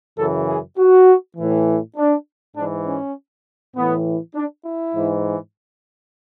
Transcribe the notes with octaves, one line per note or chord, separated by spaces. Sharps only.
F#2 C#3 E3 A4
G#4
F#4
A2 E3
D4
G#2 E3 D4
C#4
A2 E3 B3
D4
E4
G#2 E3